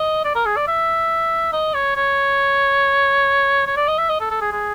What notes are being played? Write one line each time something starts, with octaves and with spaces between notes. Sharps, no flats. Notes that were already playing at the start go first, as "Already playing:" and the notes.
Already playing: D#5
D5
A#4
G#4
D5
E5
D#5
C#5
C#5
C#5
D5
D#5
E5
D#5
A4
A4
G#4
G#4